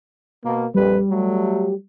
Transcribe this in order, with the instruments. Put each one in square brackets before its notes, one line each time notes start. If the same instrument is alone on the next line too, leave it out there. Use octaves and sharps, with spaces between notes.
[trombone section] B2 A#3
[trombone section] A#1 F2 B4 [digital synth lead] G3
[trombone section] F#3 A3